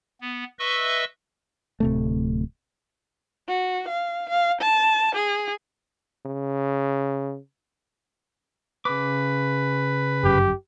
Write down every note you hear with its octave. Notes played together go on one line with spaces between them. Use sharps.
B3
B4 D#5 E5 C#6 E6
D1 C3 A3
F#4
F5
F5
A5
G#4
C#3
C#3 B4 D6
G1 F#2 G4